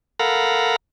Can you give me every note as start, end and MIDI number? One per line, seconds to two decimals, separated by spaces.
0.19 0.76 69
0.19 0.76 70
0.19 0.76 77
0.19 0.76 78
0.19 0.76 82
0.19 0.76 83